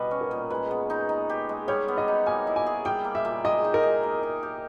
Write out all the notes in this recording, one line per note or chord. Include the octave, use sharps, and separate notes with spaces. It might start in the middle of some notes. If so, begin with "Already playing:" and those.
Already playing: B2 G3 B3 B4 D#5
C#4
A#4
A#2
G#3 B4
B3
D#4
D#4
G4
G#3
G3 C#5
B3
D#5
D#4
A#3 G#5
E4
G#5
G#4
G3 G5
A#3
E5
A#2
G#3 D#5
D#4
A#4
G#4
A#3
D#4
G4